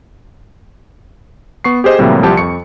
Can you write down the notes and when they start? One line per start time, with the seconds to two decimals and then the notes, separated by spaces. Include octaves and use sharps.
1.64 B3 C#6 C7
1.84 G4 G#4 C5 D#5
1.99 A2 C3 E3 F#3 G3 A#3
2.23 C2 F3 G4 A5
2.37 F2 C#6 C#7